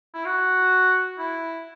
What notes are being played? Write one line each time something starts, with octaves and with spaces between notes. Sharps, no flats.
E4
F#4
E4